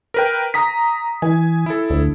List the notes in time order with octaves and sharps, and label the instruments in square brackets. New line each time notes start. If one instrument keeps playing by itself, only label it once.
[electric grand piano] A#4 B4 G5
A#5 D#6 B6
[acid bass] E3 [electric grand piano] G#5
[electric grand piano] E4 A4
[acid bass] D2